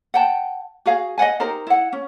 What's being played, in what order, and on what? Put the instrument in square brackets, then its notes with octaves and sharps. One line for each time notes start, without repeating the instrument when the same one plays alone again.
[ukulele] F#5 G5 A5
F#4 G#4 F5
D#5 F5 F#5 G#5
D#4 G4 A#4 C5
E4 F#5
C#4